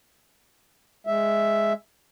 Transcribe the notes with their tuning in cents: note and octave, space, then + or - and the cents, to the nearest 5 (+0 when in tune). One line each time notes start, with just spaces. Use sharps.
G#3 +0 E5 +0